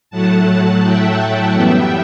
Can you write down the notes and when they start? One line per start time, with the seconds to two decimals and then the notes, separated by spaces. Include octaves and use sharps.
0.10 A2 F#3 A3 F#5 A5
0.83 E5 G5
1.18 E5 G5
1.54 F#2 E3 G3 B3 E5 G5